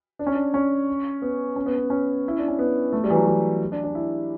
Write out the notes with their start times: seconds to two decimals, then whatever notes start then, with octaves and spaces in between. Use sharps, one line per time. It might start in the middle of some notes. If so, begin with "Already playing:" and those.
0.19 D4
0.27 C#4
0.34 D4
0.54 C#4
1.22 B3
1.56 C#4
1.66 B3
1.77 C#4
1.90 C#4
2.28 E4
2.38 D4
2.48 C#4
2.59 B3
2.93 A3
3.04 G3
3.11 E3
3.15 F#3
3.27 F#3
3.72 D4
3.84 D4
3.95 E4